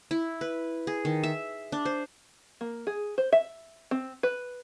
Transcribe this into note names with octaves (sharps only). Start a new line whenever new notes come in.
E4
B4
G#4
D#3
E5
D4
C5
A#3
G#4
C5
E5
C4
B4